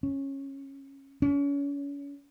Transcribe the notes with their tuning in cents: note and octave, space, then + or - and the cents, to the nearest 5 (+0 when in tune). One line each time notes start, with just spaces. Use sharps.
C#4 -15
C#4 +35